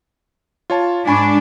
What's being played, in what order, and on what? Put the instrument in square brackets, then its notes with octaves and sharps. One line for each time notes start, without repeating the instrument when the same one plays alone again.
[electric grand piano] F4 C#5 A5
[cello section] G#2 D4 [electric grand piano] G#5 B5 C#6